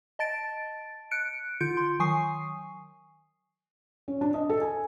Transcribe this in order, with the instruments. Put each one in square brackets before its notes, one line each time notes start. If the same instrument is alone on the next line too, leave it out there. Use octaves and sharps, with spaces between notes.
[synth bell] D#5 A5 A6 D7
F#6 C#7 D7
D3 F4 G6 C#7 D7
C6
D#3 F#3 G#5 C#6 D#6 C7
[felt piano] C#4
D4
D#5
A4
G#5